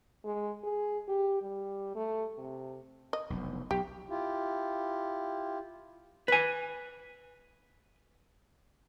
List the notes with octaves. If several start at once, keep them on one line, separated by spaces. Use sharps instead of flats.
G#3
G#4
G4
G3
A3
C3
D#5
F1 B1
B1 G4
E4 F4 G4
B4 G#5